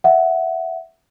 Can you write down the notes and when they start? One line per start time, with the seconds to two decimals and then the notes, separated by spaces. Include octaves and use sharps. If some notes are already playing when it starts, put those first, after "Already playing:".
0.04 E5 F#5